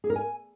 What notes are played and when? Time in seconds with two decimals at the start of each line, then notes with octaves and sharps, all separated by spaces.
0.04 G#4
0.10 A#4
0.16 G#5